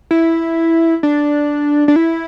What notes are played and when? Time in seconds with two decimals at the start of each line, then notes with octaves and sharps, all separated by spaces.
0.11 E4
1.03 D4
1.88 D4
1.96 E4